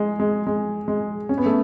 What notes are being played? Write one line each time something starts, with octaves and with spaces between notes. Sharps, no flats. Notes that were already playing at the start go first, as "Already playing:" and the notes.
Already playing: G#3
G#3
G#3
G#3
C#4
B3
A3